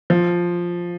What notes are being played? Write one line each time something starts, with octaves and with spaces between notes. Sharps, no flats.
F3